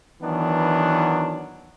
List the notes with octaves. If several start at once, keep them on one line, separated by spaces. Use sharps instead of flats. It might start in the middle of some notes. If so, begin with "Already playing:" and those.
D#3 E3 F#3 B3 D4